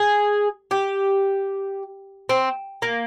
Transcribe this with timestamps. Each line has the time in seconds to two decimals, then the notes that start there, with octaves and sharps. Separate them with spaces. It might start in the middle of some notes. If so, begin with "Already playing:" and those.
Already playing: G#4
0.71 G4
2.29 C4
2.82 A#3